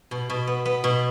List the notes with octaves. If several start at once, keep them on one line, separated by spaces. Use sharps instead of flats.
B2
B2
B3
B3
B2